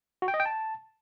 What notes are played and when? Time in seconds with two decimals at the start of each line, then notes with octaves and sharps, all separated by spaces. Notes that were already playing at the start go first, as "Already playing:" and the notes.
0.22 F#4
0.28 G5
0.34 D#5
0.40 G5
0.46 A5